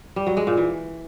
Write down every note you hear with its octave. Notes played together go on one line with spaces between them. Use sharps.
G3
F#3
G#3
A#2
E3